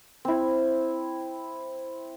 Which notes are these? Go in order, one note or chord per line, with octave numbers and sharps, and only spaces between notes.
C4 E4